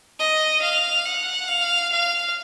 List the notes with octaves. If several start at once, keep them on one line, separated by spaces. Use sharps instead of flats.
D#5
F5
F#5
F5
F5